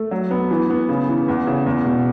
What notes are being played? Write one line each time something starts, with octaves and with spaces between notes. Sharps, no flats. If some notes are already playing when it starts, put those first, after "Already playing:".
Already playing: A3
F#3
B3
E3
B3
C#3
E3
E2
C#3
E2
B2